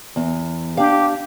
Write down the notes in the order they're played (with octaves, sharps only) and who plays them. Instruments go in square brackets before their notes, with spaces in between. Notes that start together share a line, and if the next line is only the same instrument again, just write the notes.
[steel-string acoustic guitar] E2
[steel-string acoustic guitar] D4 F5 [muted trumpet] G4